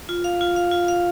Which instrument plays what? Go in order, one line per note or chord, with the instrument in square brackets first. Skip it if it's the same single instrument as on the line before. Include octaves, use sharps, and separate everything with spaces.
[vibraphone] F4
F5
F4
F5
F4
F5